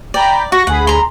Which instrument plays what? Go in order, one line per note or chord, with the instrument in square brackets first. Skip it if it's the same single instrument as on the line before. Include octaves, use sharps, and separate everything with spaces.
[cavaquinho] D5 [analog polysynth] G5 A#5 B5
[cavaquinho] F#4 [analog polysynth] C#6 A#6
[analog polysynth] D2 G#4 B5 [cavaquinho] F#5
[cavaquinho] A#5 C6